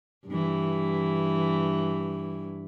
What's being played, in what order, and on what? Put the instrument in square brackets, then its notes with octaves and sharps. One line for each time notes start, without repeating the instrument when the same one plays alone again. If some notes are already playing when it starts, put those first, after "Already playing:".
[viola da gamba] G2 E3